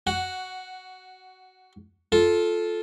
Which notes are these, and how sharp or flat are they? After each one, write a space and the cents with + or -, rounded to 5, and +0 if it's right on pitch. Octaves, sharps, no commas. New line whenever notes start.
F#4 +15 F#5 +0
F4 +5 A4 -10